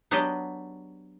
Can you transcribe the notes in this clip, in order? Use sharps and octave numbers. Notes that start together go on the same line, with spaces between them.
F#3 B3 D4 G4 B4 D#5